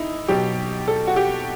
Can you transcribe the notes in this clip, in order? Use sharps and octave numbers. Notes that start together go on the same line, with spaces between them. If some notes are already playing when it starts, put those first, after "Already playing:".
Already playing: D#4 E4
B2 F#3 G4
A4
F#4
G4